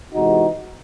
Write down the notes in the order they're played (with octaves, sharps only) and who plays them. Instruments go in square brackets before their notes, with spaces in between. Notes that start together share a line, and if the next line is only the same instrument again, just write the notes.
[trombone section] E2 C3 E3 G#3 D#4 F#4